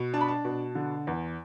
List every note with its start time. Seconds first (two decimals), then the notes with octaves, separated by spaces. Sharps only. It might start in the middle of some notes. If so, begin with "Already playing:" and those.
Already playing: B2
0.14 D4 A5
0.21 B5
0.28 A5
0.45 B2
0.75 D3
1.07 E2